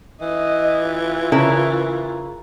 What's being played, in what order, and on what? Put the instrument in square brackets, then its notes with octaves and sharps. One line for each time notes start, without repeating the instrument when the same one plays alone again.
[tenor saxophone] E3 [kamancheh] D#5
[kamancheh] F4
[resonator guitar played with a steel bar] C#3 E4 A#4